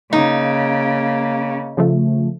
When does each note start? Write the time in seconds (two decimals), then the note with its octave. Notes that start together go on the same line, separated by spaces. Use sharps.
0.13 C#3 A#3 D#4
1.77 C#3 F3 A3